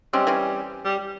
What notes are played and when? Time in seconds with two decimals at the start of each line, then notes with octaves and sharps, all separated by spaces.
0.13 G3 G#3 C4 C#4
0.27 E3 C4 C#4
0.85 G3
0.99 G3